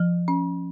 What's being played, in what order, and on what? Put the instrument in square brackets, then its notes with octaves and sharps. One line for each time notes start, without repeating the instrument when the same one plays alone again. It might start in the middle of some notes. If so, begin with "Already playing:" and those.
Already playing: [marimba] F3
C#4